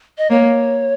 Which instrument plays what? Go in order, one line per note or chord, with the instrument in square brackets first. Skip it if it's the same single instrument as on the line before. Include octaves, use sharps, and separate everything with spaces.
[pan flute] D#5
[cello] A#3 [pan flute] C#5